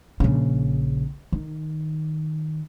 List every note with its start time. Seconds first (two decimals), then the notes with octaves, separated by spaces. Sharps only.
0.20 A#1 C#3
1.32 D#3